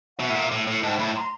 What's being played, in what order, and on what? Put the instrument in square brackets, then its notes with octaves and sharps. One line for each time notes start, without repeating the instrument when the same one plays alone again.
[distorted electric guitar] B2 [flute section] E5 F#5
[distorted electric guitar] A2
A#2
A2
A2
[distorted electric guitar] G#2 [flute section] G5 A5
[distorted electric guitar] A2 [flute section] A5 B5
[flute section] A#5 C6